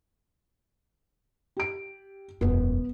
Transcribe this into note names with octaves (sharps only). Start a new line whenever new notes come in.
G4 D7
E1 F#2 B3